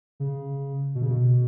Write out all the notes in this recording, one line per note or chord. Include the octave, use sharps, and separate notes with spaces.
C#3
B2
C#3
B2